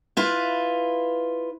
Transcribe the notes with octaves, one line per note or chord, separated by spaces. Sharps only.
E4 F4 B4